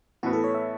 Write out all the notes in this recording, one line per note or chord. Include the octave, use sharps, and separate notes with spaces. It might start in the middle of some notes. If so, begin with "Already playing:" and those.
A2 E3 B3 F#4
A4
C#5
E5